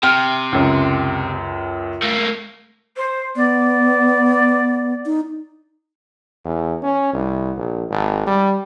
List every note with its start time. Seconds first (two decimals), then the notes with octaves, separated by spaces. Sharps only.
0.03 C3 G5 F6
0.53 C#2 F#2
2.02 A3 A#3
2.97 C5
3.36 B3 D5
5.06 D#4
6.45 E2
6.83 C#4
7.14 C2
7.57 A#1
7.90 G#1
8.27 G3